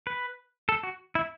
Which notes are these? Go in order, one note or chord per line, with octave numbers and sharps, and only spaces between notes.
B4
A4
F#4
E4